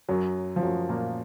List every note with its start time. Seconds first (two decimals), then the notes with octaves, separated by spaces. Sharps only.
0.09 F#2 F#3
0.56 F3
0.63 F#2 F#3
0.89 A#2 A#3